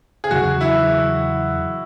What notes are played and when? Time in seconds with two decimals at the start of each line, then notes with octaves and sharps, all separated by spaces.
0.24 G#4
0.31 E2 C#3 F#3 F#4
0.61 E4